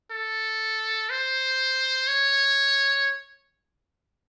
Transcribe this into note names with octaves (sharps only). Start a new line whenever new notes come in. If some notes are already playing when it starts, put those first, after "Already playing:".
A4
C5
C#5